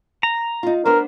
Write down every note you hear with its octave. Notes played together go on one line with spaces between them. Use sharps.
A#5
D#4 F4
B3 D4 A#4 C5